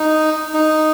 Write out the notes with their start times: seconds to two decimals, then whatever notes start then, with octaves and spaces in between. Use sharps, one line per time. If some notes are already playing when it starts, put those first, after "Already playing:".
Already playing: D#4
0.54 D#4